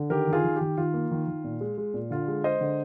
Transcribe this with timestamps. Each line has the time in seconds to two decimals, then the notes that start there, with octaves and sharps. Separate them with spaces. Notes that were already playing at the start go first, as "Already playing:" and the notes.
Already playing: D3
0.10 D#3 G4 A#4
0.27 D#3
0.33 F4 G#4
0.44 D#3
0.56 G4
0.61 D#3
0.77 D#3 F4
0.94 A#3
1.11 D#3
1.28 D#3
1.44 A#2
1.61 G#3
1.78 G#3
1.94 A#2
2.11 D3 F4
2.28 G#3
2.44 G#3 C5 D#5
2.61 D3